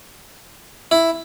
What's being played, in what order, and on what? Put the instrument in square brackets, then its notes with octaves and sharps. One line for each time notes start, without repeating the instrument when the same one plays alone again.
[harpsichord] E4